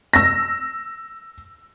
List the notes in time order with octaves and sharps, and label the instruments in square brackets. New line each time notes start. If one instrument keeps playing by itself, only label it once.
[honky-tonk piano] E6 A#6